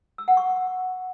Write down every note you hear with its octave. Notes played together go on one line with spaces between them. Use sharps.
E6
F#5
C#6